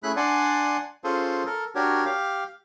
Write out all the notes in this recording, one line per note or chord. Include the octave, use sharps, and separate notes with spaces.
A3 C#4 E4 G#4 B5 F#6
D4 D5 F#5 G#5 C6
C#4 F4 G#4 A4 C5
A4 A#4
D4 F#4 G4 A#4 C#5
G4 F5